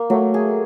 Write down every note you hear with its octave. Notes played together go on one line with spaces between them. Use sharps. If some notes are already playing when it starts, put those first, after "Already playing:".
Already playing: A#3
F#3 A3
G#4